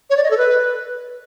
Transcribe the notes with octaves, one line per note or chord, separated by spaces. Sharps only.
C#5
D5
D#5
A4
B4